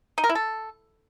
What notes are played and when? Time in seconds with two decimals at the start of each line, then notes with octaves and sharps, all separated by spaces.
0.18 D#4
0.24 A#4
0.29 E4
0.35 A4